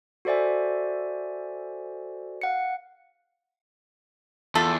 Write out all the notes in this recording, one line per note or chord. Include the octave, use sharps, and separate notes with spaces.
F#4 A4 C5 D5 E5 G#5
F5 F#5 C#7
E2 A3 F4 A4